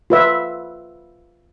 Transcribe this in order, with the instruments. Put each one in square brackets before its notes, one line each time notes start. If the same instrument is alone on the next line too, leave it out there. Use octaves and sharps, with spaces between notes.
[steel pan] F4 B4 E5